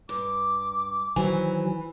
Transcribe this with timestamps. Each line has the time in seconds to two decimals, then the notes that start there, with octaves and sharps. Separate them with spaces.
0.09 G2 D6
1.16 D#3 E3 F#3 C5 G#5